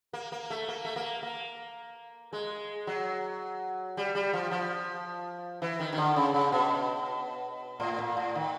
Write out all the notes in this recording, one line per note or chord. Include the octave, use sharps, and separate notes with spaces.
A#3
A#3
A3
A#3
A3
A#3
A#3
G#3
F#3
G3
G3
F3
F3
E3
D#3
D#3
D3
C#3
C#3
B2
A2
A#2
A2
D#3